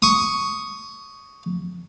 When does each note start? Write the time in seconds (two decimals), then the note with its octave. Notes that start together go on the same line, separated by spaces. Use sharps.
0.02 C#6 D#6